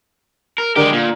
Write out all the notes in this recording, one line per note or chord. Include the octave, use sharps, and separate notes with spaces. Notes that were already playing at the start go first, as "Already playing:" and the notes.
A#4
D3 G#3 G4 A#4
A#2